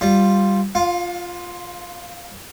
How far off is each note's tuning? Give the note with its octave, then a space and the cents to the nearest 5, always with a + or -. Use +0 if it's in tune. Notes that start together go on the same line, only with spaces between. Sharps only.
G3 +0 F4 +0
F4 +0 F5 +35